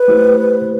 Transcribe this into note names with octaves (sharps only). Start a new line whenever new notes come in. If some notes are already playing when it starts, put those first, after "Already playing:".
Already playing: B4
A3 E4 G4 C5